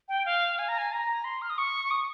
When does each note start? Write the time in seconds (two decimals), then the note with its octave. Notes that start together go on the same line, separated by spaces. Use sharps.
0.09 G5
0.26 F5
0.59 G#5
0.68 A#5
0.78 G#5
0.92 A#5
1.24 C6
1.42 F6
1.50 D#6
1.58 C#6
1.91 D#6